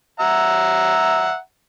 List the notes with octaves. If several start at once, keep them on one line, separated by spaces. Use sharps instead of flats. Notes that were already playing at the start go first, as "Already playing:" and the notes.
E5 F#5 A#5